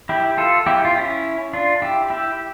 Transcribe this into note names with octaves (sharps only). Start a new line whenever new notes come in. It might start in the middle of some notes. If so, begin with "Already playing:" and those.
E4 G4
F4 A4
E4 G4
F4
C#4 E4
D4 F4
E4 G4
E4 G4